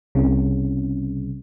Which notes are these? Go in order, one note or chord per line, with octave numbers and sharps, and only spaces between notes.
C2 C#3